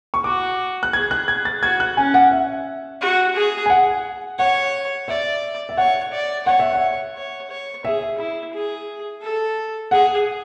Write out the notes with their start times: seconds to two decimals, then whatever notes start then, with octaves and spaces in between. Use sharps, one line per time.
0.14 C#6
0.24 F#4 D6
0.83 F#6
0.93 G#4 G#6
1.11 F#6
1.28 G#6
1.45 A6
1.63 F#4 G#6
1.80 F#6
1.97 C#4 G#5
2.14 F#5
2.31 E5
3.01 F#4
3.36 G#4
3.66 G#5
3.70 F#5
4.39 C#5 F#5
5.08 D5 E5
5.69 E5
5.77 C#5 F#5
6.12 D5
6.46 C#5 F#5
6.60 E5
6.73 F#5
7.16 C#5
7.50 C#5
7.85 G#4 E5
8.18 E4
8.53 G#4
9.22 A4
9.91 G#4 F#5